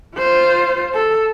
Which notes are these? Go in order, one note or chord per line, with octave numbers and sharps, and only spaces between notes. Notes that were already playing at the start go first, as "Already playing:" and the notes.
F4 C5
A4